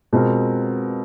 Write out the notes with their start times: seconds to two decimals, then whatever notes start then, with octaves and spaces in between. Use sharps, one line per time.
0.13 B2 G#3 C4 F4 A#4